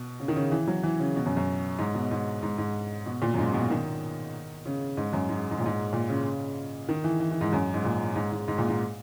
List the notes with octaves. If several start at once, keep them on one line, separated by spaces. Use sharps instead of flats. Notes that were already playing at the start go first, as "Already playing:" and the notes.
Already playing: B2
C#3
D#3
C#3
E3
F#3
E3
C#3
B2
F#2
F#2
G#2
B2
G#2
G#2
G#2
B2
A#2
F#2
G#2
B2
D#3
C#3
G#2
F#2
G#2
G#2
A#2
G#2
A#2
C#3
D#3
E3
E3
E3
G#2
F#2
G#2
A#2
G#2
G#2
G#2
A#2
G#2